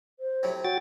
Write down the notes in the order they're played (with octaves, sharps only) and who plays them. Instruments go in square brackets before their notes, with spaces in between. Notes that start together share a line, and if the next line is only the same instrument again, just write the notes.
[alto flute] C5
[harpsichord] A2 C3 F#3
[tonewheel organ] F#4 G5 A6 [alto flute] C#5